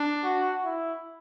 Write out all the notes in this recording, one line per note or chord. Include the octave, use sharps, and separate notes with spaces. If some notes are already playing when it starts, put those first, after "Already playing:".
Already playing: D4
F#4
E4